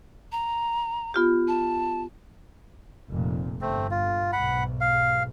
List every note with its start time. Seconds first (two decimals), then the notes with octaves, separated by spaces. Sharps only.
0.32 A#5
1.14 B3 F4 G4
1.48 A5
3.10 F1 A#2
3.61 G1 A3 C4
3.91 F4
4.33 B1 G#2 F#5 B5
4.81 F5